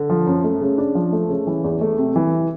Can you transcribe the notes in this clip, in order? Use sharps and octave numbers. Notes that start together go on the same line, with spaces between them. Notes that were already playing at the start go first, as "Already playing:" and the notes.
Already playing: D3
F3
F#2
A3
C#3
D4
F3
A3
C#3
E3
E2
A3
C3
E3